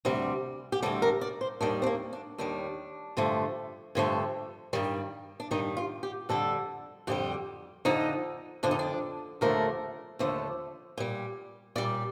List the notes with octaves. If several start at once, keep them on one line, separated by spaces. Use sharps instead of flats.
D2 C3 G3
G4
D2 C3 G3 A4
A#4
D5
C5
D#2 D#3 G3 D4
C4
A#3
D4
D#2 D#3 G3 D4
G2 D3 F3 A3
G2 D3 F3 A3
G2 D#3 G3
D4
G2 D#3 G3 D#4
F4
G4
F2 D3 G3 A4
F2 D3 G3 G4
F2 D3 F3 D#4
F2 D3 F3 D4
D#4
D4
D#2 D3 F3 A3 A#4
D#2 D3 F3 A3
A#2 G3
A#2 G3 D5